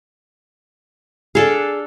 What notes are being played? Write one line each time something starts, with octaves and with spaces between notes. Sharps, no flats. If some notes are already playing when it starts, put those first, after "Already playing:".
D4 G#4 A4 F5